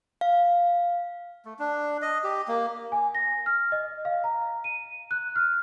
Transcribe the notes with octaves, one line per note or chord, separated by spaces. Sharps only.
F5
A3
D4
D#5
G4
A#3
G#5
A#6
F6
D#5
F5
A#5
D#7
F#6
F6